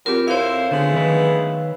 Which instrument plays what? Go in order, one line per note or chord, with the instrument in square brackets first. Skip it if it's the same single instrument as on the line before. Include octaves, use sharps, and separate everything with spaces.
[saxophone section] E2 F#3 G4 [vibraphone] C4 F4 A#4
[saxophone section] F2 E4 C5 [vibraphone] C#5 F5
[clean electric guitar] D3 [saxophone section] G#3 A3 B3
[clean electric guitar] D#3 B4